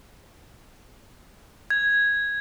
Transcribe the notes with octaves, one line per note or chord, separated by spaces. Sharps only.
G#6